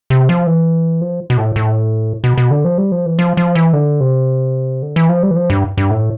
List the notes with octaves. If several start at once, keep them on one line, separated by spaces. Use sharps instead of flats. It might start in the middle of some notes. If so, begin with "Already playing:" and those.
C3
F3
E3
F3
B2
A2
A2
B2
B2
D3
F3
G3
F3
E3
F3
F3
E3
D3
C3
D3
E3
F3
G3
E3
F3
G2
G2
A2